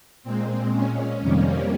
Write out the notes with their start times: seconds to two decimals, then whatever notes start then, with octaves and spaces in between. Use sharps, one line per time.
0.23 A#2 G#3 C4
0.72 C#4
1.21 F2 C3 D#3 G3 A#3